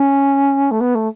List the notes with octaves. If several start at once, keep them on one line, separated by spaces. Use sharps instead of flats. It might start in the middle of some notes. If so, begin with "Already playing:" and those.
Already playing: C#4
A3
B3
A3